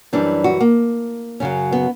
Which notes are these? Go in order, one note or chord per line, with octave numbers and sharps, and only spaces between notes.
F#2 E3 G3 D4
F#4
A#3
F#2 C#3 F#3 C#4
B3